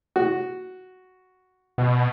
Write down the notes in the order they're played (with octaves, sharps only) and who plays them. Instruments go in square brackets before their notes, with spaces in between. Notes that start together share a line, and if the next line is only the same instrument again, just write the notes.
[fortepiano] F#4
[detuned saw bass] B2